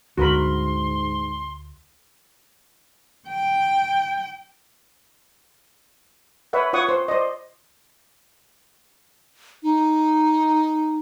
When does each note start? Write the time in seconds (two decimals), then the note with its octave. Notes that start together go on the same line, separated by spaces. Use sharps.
0.18 D2 G#2 F#4 A#4 B5 C6
3.29 G5
6.53 B4 C#5 E5 F#5
6.73 F4 C#5 F#5 C#6 D#6
6.89 C5
7.08 C5 D5 D#5
9.63 D#4